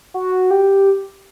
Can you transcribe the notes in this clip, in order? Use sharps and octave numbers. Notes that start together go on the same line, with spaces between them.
F#4
G4